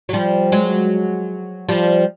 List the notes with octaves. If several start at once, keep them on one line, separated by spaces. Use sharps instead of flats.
F#3
F3 G3
F#3 G#3
F3 G3